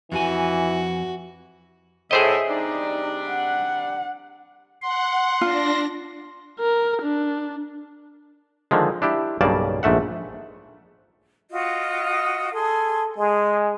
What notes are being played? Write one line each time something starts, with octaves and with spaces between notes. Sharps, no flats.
F2 E3 F#4 G#5
A2 G#4 C5 D#5 E5
C3 G3 D4 D#4
F#5
F#5 C6
D4 F4 A#6
A#4
D4
D3 D#3 F3 G#3
D4 E4 G4
B1 G2 C#3 A#3 D5 A5
A#1 G#2 A3 E5 F#5
F4 F#4 D#5
G#4 A4 C6
G#3 G#4